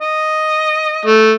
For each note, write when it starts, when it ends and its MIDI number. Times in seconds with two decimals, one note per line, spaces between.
0.01 1.12 75
1.06 1.32 57